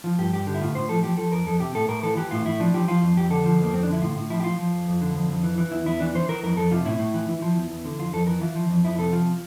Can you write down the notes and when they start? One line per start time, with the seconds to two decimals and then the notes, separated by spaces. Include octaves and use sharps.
0.04 F3 F4
0.19 G2 G4
0.33 G2 G4
0.47 D3 G4
0.54 E4
0.61 A2 F4
0.75 A2 C5
0.89 F3 A4
1.03 F3 G4
1.17 F3 A4
1.32 F2 A#4
1.46 F2 A4
1.60 C3 G4
1.75 A2 A4
1.89 A2 A#4
2.03 E3 A4
2.17 E3 G4
2.31 A2 F4
2.46 A2 E4
2.60 F3 D4
2.74 F3 G4
2.88 F3 F4
3.02 F2
3.16 F2 G4
3.30 D3 A4
3.45 F3
3.59 F2 A#3
3.73 F2 C4
3.83 D4
3.87 D3 E4
4.02 A2 F4
4.16 A2
4.30 F3 E4
4.40 G4
4.44 F3 F4
4.58 F3
4.73 F2
4.87 F2
5.01 D3
5.15 F2
5.30 F2
5.43 E3
5.58 E3
5.72 E2 E4
5.86 E2 E4
6.00 E3 D4
6.15 E3 C5
6.29 E3 A#4
6.43 F2 A#4
6.57 F2 A4
6.71 C3 F4
6.85 A2 E4
6.99 A2
7.14 E3
7.29 E3
7.42 F3
7.56 E2
7.70 E2
7.85 D3
7.98 F2 F4
8.14 F2 A4
8.27 E3 A#4
8.41 E3 F4
8.56 F3
8.70 F2
8.84 F2 E4
8.98 C3 A4
9.12 F3 F4